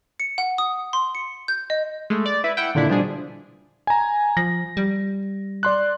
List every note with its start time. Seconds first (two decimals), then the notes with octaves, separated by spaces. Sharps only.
0.20 C#7
0.38 F#5
0.58 D#6
0.93 C6
1.15 C#7
1.48 G6
1.70 D#5
2.10 G#3 A3
2.26 D5
2.44 E4 B4 E5
2.57 E4 E5 F#5 G5
2.75 A#2 D3 D#3 D4 E4
2.88 B2 F3 G3 D4 G#4
3.87 G#5 A#5
4.37 F3 A#6
4.77 G3
5.63 D5 C6 F#6